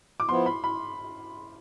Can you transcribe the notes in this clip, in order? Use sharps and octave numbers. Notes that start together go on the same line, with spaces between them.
D6
F3 B3 E4 C6
B5
B5